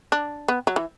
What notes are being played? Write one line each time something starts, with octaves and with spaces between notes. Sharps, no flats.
D4
B3
F#3
E3